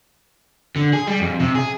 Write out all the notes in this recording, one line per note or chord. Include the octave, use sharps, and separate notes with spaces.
D3
G#4
G3
F2
C3
G#4